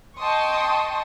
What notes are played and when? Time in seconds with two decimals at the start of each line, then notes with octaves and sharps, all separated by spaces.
0.19 D#5 G5 A5 C6 C#6 D#6